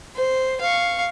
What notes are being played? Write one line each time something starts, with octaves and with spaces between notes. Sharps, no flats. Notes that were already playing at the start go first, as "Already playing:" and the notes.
C5
F5 C#6